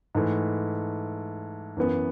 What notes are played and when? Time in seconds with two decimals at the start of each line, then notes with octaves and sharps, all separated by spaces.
0.15 G#2 E3 A3
1.77 F#2 E3 B3